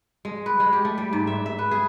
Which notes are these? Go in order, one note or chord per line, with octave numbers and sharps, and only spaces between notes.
G#3
B4
G#3
G4
A3
G3
G#2
E5
E5
B4
G#4